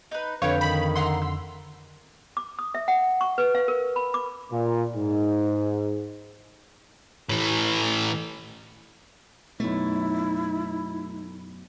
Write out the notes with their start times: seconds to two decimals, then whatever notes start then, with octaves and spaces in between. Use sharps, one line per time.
0.11 D#4 B4
0.42 F2 D3 B4 C#5 F5 G5
0.61 D#3 B5
0.95 E5 F#5 A#5 C6
1.22 E6
2.37 D6
2.59 D#6
2.75 E5
2.88 F#5
3.21 C#6
3.38 B4
3.55 F5
3.68 A#4
3.96 B5
4.14 D6
4.51 A#2
4.95 G#2
7.29 A2 E3
9.60 F#2 B2 A3 D#4 E4